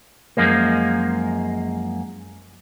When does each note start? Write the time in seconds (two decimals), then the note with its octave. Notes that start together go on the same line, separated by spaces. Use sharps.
0.37 F#2 F3 G#3 A#3